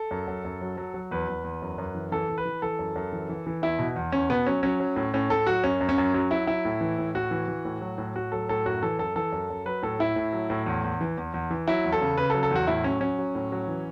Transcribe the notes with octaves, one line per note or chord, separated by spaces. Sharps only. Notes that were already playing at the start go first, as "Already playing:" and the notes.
Already playing: A4
F#2
F#2
F#2
F#3
F#3
F#3
E2 B4
E2
E2
F#2
F#2
E3
E3 A4
E3
B4
E3
E3 A4
F#2
F#2
E3
E3
E3
E2 E4
B2
E2
E2 C#4
B2 B3
F#3 C#4
F#3 C#4
F#3
A2
A2 C#4
A2 A4
F#3 F#4
F#2 C#4
F#2
C#4
F#2
F#3 C#4
F#3 E4
F#3 E4
A2
E3
A2
A2 F#4
E3
E3
A2
F#3
A2
A2 F#4
F#3 A4
A2 A4
F#2 F#4
E3 A4
F#2 A4
E3 A4
F#2
F#2
F#3 B4
A2 A4
A2 E4
A2
F#3
A2
E2
E2
E3
E2
E2
E3
F#3 E4
E2
A4
C#3
C#3 B4
A4
F#3
A4
E2 F#4
A2 E4
F#3 C#4
F#3 C#4
F#3
A2
F#3
E3